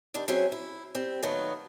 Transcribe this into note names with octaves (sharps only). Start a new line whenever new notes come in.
D#3 G3 D4
F#3 C4 C#4 G#4 E5
E4
G3 C4
A#2 D#3 F#3 A3 B3